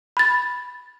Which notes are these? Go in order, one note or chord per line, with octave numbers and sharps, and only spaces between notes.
B5 A6